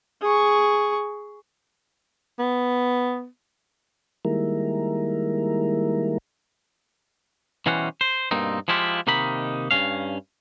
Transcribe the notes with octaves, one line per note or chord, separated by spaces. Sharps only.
G#4 C#6
B3
D#3 G3 G#3 A#3 E4 A#4
B2 E3 G3 C#4 C5 F#5
C5
G2 B2 A#3 C4 D#4
F3 G#3 E4 F4 G4
C3 D#3 A#3 D#4 B5
G2 C#3 C#4 F5